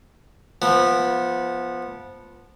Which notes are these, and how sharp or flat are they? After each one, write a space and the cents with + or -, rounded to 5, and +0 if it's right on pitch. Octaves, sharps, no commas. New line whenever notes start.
F3 +0 B3 -15